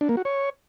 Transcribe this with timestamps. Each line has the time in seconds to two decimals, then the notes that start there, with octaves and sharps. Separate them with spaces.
0.01 D4
0.09 A#3
0.17 F#4
0.25 C#5